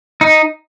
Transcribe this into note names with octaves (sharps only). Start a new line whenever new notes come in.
D#4